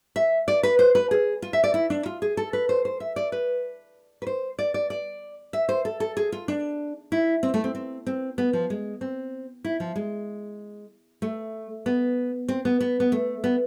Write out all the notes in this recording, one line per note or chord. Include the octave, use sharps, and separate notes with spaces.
E5
D5
B4
C5
B4
G#4
F4
E5
D5
E4
D4
F4
G#4
A4
B4
C5
C5
E5
D5
B4
B4
C5
D5
D5
D5
E5
C5
A4
A4
G#4
F4
D4
E4
C4
A3
C4
C4
C4
B3
F3
G#3
C4
E4
F3
G#3
A3
B3
C4
B3
B3
B3
A3
B3